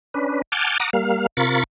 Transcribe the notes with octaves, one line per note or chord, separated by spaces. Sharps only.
C#4 D4 B4
F#5 G#5 A5 D6 F6 G6
F#5 A#5 D6 D#6
G3 A#3 F5
C3 F4 A#4 B5 C#6 A6